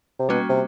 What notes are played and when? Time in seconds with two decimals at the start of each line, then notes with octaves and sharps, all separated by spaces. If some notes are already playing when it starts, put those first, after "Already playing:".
0.19 C3
0.29 B2 G3 A#3 C#4 F#4
0.49 C3